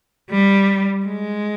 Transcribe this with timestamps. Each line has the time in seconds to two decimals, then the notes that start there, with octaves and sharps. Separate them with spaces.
0.30 G3
1.06 G#3